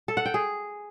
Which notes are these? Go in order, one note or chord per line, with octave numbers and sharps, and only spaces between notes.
A4
F#5
G5
G#4